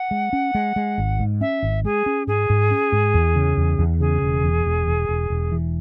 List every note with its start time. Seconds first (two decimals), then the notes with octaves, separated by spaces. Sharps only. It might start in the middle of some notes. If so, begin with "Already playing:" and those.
Already playing: F#5
0.11 G#3
0.33 C#4
0.55 G#3
0.76 G#3
0.98 G#1
1.20 G#2
1.41 C#4 E5
1.63 G#1
1.84 G#3 G#4
2.06 C#4
2.27 G#2 G#4
2.50 G#2
2.71 C#4
2.92 G#2
3.14 E2
3.36 C#3
3.57 E2
3.79 E2
4.00 C#3 G#4
4.22 E1
4.44 E2
4.65 E1
4.88 E1
5.09 E1
5.30 E1
5.52 E3